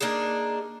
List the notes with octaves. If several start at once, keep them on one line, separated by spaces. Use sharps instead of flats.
A#3 D4 D#4 G#4